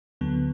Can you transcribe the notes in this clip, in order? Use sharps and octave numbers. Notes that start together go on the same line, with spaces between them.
D2 D3 F#3 B3